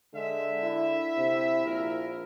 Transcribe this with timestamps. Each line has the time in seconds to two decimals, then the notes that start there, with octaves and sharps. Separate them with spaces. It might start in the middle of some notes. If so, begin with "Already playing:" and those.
0.14 D3 G#3 E5
0.63 E4
1.17 C3
1.66 A#1 A#4